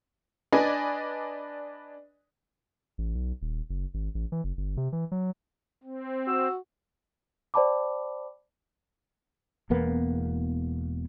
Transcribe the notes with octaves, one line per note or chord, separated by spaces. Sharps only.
D4 B4 D5 D#5 G#5
A1
B1
D#1
F#1
G#1
A1
E3
F#1
G1
C3
E3
F#3
C4
F#4 E6
C5 D5 G5 A5 B5 D6
E1 E2 A#3 B3